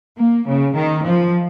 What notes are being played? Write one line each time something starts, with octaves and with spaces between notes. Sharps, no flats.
A#3
C#3
D#3
F3